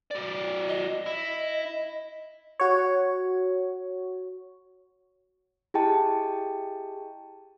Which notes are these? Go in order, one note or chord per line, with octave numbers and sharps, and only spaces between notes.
F#3 D5
D#5
E4
F#4 C#5
E4 G4 G#4 D#5 G5 A5